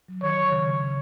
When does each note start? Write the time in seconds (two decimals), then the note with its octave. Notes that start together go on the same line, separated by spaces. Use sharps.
0.08 F#3
0.23 D#3 C#5
0.37 D#3
0.52 C#3
0.67 C#3
0.81 C#3